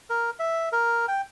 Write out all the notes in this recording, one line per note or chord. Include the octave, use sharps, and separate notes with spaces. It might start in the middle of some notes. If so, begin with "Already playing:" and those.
A#4
E5
A#4
G5